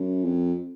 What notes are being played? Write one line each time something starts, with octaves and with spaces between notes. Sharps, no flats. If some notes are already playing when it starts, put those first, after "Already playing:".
Already playing: F#2
F2